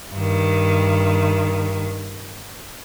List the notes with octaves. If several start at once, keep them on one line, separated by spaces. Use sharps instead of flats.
G2 D#3